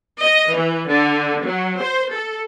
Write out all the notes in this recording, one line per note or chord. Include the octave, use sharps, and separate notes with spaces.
D#5
E3
D3
F#3
C5
A4